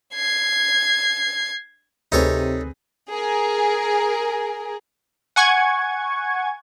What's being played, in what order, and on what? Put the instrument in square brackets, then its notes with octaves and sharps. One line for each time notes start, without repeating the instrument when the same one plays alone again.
[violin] G#6 C7
[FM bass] D2 [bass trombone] C3 [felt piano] C4 G#4 B4 [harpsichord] D#4 A4 C#5
[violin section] G#4 A#4
[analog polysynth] F#5 G#5 C#6 G#6